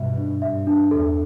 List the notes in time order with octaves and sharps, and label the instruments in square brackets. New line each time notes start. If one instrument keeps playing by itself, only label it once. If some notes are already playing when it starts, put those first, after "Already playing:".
Already playing: [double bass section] G2 B2 [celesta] E5
[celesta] D4
[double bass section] G2 [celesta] E5
[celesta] D4
[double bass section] E2 [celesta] A4